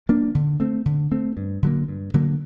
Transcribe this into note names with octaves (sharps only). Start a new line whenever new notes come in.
F#3 A#3 D4
D3
A3 C4
D3
A3 C4
G2
D3 F#3 A#3
G2
D3 F#3 A#3